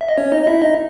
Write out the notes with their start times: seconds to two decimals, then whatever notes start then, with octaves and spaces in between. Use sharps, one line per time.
0.01 E5
0.09 D#5
0.17 C#4 C#5
0.32 D#4 D#5
0.42 D#5
0.47 E4 E5
0.62 D#4 D#5